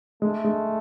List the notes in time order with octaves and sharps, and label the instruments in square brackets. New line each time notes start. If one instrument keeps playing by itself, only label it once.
[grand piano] G#3 [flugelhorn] A3
[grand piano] G#3